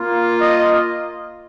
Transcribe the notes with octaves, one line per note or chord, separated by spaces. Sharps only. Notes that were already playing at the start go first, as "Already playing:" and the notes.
Already playing: A#3 F4
D#5